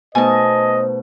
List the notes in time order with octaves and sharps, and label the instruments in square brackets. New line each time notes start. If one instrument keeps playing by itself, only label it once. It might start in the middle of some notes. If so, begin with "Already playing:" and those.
[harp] B2 A3 D#4 [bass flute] C5 [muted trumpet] D#5 [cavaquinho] G#5 A5